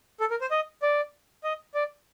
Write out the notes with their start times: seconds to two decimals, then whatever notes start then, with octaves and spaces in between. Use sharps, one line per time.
0.20 A4
0.30 A#4
0.41 C5
0.51 D#5
0.82 D5
1.44 D#5
1.74 D5